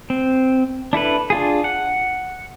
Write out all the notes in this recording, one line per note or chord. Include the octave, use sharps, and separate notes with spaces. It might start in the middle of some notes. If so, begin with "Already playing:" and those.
C4
D4 E4 A4 B4
D4 F4 G#4
F#5